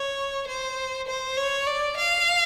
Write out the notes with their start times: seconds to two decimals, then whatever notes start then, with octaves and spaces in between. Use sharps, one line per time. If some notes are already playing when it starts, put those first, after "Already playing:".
Already playing: C#5
0.47 C5
1.07 C5
1.37 C#5
1.67 D5
1.97 F5